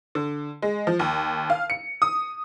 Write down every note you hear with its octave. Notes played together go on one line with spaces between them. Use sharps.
D3
G#3
F3
D#2
F5
C#7
D#6